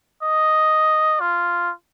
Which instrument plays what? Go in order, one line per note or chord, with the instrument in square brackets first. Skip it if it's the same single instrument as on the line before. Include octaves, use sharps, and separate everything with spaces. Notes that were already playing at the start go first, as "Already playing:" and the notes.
[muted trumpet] D#5
F4